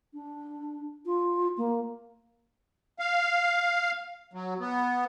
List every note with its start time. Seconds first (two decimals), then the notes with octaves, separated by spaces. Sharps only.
0.14 D4
1.06 F4
1.57 A#3
2.99 F5
4.33 F#3
4.60 B3